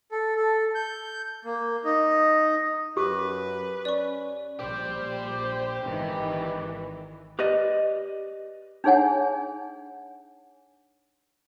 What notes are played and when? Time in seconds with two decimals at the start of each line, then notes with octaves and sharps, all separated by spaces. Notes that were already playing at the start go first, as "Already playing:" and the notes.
0.12 A4
0.36 A4
0.75 G6
1.45 A#3
1.85 D#4
2.97 F#2 G4 B4 D6
3.85 C#4 D5 C#6
4.59 A#1 G4 C5 D5
5.84 G#1 D#3 E3
7.39 G4 B4 D5 D#5
8.84 D4 D#4 G#4 C#5 F#5 G#5